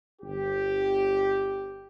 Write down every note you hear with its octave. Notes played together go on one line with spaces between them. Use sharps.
G1 G4